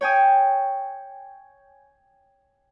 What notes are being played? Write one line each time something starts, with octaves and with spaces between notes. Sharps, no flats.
C#5 G5 G#5 D#6